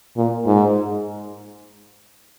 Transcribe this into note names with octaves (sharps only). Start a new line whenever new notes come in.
A#2
G#2